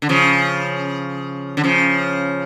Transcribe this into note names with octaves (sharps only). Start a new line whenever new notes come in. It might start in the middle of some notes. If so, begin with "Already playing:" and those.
D3
C#3 F3
D3
C#3 F3